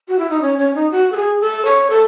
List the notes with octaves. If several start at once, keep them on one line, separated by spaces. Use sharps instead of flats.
F#4
E4
D#4
C#4
C#4
D#4
F#4
A4
G#4
A4
C#5
A4